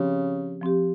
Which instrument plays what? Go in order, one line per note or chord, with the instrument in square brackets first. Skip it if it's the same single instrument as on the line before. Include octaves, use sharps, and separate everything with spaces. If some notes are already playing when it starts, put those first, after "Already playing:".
Already playing: [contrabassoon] C#3 [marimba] F3 C4 G4
[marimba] F3 C4 G4